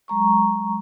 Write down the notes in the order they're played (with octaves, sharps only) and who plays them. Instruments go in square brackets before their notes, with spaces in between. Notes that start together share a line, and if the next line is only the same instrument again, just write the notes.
[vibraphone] F#3 G#3 A#5 C#6